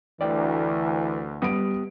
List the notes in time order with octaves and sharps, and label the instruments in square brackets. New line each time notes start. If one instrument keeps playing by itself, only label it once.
[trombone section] D2 [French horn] E3 [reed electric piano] D5 G5
[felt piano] G3 F#5 D7 [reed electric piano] B3 G4 D#6